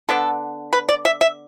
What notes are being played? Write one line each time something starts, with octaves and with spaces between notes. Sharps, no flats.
D3 B3 D4 A4
B4
D5
E5
E5